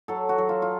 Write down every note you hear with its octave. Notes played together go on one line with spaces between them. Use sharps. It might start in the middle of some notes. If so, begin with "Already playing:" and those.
F#3 A4
F#4
F#3
F4
F4